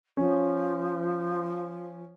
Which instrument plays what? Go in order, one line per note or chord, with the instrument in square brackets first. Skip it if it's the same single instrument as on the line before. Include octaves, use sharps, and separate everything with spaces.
[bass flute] F3 [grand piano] C#4